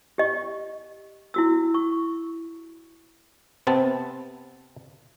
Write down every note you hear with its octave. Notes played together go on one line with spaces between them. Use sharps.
G4 D#5 C#6
E4 F#4 E6
C#6
C3 B3 C4 A5